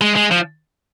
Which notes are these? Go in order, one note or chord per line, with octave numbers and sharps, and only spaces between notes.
G#3
G#3
F3